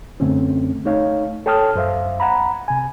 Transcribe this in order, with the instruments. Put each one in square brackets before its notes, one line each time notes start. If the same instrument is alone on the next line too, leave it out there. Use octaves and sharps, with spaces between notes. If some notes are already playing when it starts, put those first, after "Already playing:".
[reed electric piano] F#2 D3 A3 C4 C#4
A3 D#4 C#5 F5
A4 C#5 G5 A5 D#6 F6
F#2 C5 E5 F5
F#5 A#5 B5
C3 G#5